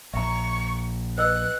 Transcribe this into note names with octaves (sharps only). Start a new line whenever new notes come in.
A#1 E5 A#5 C#6
B4 D#5 E6 F#6